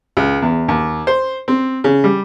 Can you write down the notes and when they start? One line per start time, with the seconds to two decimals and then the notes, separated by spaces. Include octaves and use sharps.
0.17 C#2
0.42 E2
0.68 D#2
1.07 C5
1.48 C4
1.84 C#3
2.04 G3